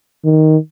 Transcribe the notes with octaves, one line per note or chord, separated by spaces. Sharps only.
D#3